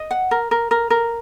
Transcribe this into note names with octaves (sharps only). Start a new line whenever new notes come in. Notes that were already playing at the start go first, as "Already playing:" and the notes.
Already playing: D#5
F#5
A#4
A#4
A#4
A#4